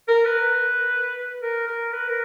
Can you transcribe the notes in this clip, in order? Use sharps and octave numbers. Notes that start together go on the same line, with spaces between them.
A#4
B4
A#4
A#4
B4
A#4